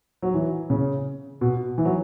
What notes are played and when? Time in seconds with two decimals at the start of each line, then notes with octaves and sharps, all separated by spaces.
0.22 F#3
0.34 E3
0.70 C#3
1.41 B2
1.78 E3
1.85 F#3